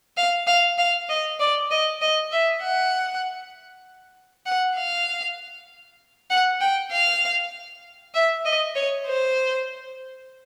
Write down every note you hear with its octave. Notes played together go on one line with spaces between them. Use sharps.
F5
F5
F5
D#5
D5
D#5
D#5
E5
F#5
F#5
F5
F#5
G5
F5
E5
D#5
C#5
C5